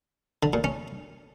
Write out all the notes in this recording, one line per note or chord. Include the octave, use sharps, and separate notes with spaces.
D3
A#2
C#4